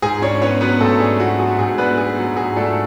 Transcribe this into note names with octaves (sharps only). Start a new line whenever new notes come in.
G#2 G#4 G#5
C#4 D4 C#5
B3 C#4 C#5
F#3 B3 B4
G#2 A3 A4
D4 G#4
B3 F#4
F#3 G#4
G#2 G#4
B3 D4 B4
B3 G#4
F#3 F#4
G#2 G#4
A3 D4 A4